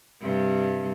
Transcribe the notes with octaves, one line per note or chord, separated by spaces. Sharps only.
G2 C3 G3